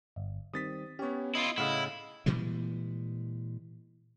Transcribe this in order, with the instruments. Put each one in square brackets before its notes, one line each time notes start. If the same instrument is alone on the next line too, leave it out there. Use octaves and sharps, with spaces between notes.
[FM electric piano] G1
[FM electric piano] D#3 G3 C4 [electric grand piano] D#6 A6 B6
[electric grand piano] B3 C#4 [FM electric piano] G4 C#5
[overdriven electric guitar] E4 F4 [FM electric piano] D#5
[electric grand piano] A2 C#3 [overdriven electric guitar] E4 [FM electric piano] D#5 F5 F#5
[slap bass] A#2 E3 G3 G#3